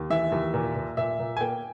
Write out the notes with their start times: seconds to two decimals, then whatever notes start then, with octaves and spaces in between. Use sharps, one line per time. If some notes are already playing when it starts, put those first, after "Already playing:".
Already playing: D#2
0.10 E3 E5
0.32 D#2
0.54 A#2
0.76 A#2
0.97 A#2 E5
1.19 A#2
1.37 G#5
1.41 A#3 G5